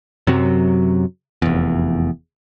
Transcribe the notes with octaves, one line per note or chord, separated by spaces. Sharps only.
F#2 C3 F#3
F1 E2